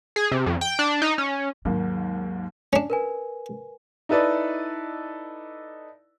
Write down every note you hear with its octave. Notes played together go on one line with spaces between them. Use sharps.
G#4
C3
F2
G5
D4
D#4
C#4
D#2 G#2 F#3 A#3
C#4 D4
A#4 B4 G#5
D#4 E4 A4 B4 D5 D#5